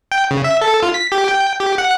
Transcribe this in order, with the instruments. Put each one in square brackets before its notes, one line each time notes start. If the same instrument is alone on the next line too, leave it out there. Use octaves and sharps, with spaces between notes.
[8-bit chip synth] G5
C#3
E5
A4
F4
B6
G4
G5
G4
F#5